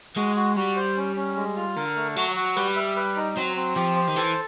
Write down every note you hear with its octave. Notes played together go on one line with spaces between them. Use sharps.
G#3 F#4
F#4
G3 F#4
C5
C#4
C#4
G#3
F4
D3 A#4
A3
F#3 F#4
F#4
G3 B4
E5
B4
D#4
F#3 C4
C4
F3 G4
C5
D#3
E3 A4